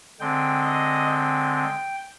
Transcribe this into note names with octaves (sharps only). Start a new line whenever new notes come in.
D3 G#3 C4 G5
D#5
G5
G5